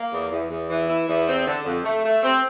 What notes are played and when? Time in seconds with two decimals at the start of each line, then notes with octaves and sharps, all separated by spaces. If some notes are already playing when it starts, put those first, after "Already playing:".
Already playing: A#3
0.12 E2
0.31 E2
0.50 E2
0.69 E3
0.89 E4
1.08 E2
1.28 C4
1.47 D3
1.65 F2
1.85 A3
2.05 A3
2.23 C4